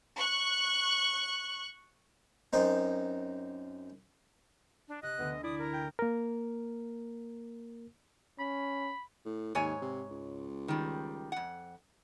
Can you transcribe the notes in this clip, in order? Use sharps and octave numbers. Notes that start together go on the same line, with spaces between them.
C#6 F#6
F#2 C4 D#4
D4
C3 D#5 F#6
D2 D3 B3
E4 D5 D#6
A#4
G5
A#3 A#4
C#4 B5
A2
D#2 G#2 C#5 G#5
C3
C#2
D#3 G3
F2 F#5